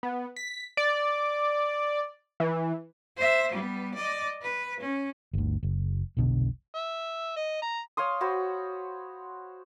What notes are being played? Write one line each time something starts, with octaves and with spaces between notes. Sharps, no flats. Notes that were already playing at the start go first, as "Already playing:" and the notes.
B3
B6
D5
E3
C5 E5
G3 B3
D5 D#5
B4
C#4
G1 D2
F#1
F1 B1 B2 D3
E5
D#5
A#5
C#5 F5 C6 D#6
F#4 C5 C#5 B5